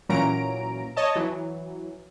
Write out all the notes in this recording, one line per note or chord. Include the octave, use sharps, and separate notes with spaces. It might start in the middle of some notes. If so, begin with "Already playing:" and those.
A#2 E3 F#3 C#4 A#5 D7
C#5 D#5 A5
E3 F#3